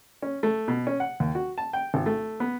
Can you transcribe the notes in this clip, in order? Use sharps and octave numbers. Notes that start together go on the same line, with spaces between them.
C#4
A3
B2
C#4
F#5
D#2
F#4
A5
G5
G#1
A3
B3